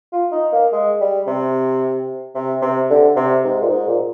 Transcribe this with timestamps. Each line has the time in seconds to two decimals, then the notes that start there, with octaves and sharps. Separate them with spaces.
0.12 F4
0.32 D#4
0.52 A#3
0.73 G#3
1.01 G3
1.27 C3
2.35 C3
2.62 C3
2.90 D3
3.16 C3
3.44 G#2
3.62 A#2
3.70 G#2
3.87 A#2